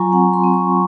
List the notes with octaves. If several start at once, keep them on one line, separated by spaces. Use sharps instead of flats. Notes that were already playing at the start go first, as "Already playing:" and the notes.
Already playing: F#3 F4 G#5 A#5 C#6
C4 F#5
C6
C4
C#6